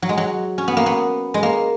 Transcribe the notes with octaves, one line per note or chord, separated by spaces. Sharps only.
F#3
G#3
F#3
C#4
B3
A#3
B3
G#3
A#3